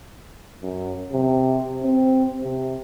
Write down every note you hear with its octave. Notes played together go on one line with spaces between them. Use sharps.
F#2
C3
C4
C3